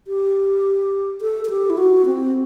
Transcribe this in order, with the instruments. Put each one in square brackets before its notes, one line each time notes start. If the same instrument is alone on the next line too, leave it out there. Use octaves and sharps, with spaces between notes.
[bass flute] G4
A4
A4
G4
E4
F#4
C4